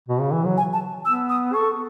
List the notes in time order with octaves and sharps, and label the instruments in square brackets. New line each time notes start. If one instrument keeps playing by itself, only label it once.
[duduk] B2
C#3
E3
F#3
[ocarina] G#5
A5
[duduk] B3 [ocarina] E6
[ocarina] D#6
[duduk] A4 [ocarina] C#6